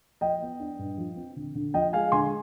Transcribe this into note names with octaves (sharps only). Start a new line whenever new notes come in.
F3 D#5 G5
B3
D4
G2
F3
C4
D3
D3
F3 D#5 G5
G#3 F5 G#5
D3 G#5 C6